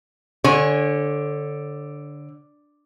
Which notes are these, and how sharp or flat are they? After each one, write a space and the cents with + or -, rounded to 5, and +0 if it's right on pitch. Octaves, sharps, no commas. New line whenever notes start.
D3 +0 C#5 -30 G#5 +0